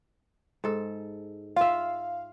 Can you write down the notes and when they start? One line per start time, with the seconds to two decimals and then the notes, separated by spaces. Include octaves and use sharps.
0.64 G#2 A4
1.56 F4 E5 F5